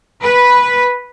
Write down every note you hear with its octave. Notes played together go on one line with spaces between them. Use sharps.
B4